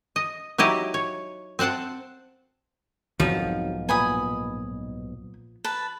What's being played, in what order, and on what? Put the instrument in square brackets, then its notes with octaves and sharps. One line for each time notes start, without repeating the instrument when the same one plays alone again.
[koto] D#5
F#3 D#4 E4 G4 D#5
C#5
C4 C5 F#5 G5 A5
[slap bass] B1 G#2 B2 [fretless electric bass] F2 D#3 F#3 [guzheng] F3
[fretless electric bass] A#2 B3 [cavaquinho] G#5 B5 D#6
[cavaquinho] B4 A5